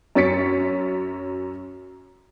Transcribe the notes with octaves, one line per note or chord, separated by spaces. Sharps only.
F#2 C#4 A6 B6 C#7